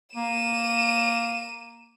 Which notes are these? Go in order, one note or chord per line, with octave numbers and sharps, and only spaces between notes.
A#3 D#7 E7